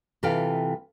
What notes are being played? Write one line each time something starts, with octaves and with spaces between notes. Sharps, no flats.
C3 E3 F4 A4 F5 G5